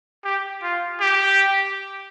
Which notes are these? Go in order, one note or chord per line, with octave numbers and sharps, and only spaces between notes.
G4
F4
G4